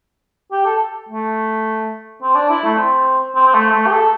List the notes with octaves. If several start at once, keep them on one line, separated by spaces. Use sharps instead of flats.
G4
A4
A3
C4
D4
E4
A3
C4
C4
C4
A3
A3
G4
A4